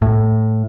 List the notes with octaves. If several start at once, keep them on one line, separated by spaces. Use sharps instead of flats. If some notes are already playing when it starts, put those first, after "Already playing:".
A2